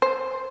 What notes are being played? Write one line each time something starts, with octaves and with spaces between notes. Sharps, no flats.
C5